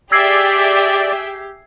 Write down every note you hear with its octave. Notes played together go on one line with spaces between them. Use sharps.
G4 G#4 D5 E5 G5 E6 G#6 C7